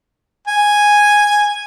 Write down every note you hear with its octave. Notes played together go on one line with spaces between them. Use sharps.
G#5